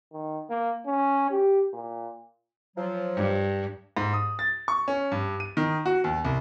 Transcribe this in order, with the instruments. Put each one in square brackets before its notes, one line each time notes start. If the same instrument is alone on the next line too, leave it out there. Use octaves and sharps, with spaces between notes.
[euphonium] D#3
A#3
C#4
G4
A#2
[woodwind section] F3 F#3
[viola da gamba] G2
[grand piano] G#2
D#6
A6
C#6
C#4
G2
D#7
D#3
F#4
D#2
C2